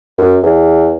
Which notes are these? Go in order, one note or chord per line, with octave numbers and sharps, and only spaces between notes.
F#2
E2